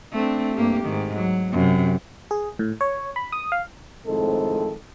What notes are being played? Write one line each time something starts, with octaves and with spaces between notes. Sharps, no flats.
A3 C4 D4
G2 A#3 G4
G#2 D#3
F#3
F#2 C3
G#4
A2
C#5
B5
D#6
F5
F2 A2 D#3 G#3 C4 A4